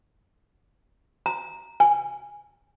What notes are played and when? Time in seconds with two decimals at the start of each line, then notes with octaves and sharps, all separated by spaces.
1.26 A#5
1.80 G#5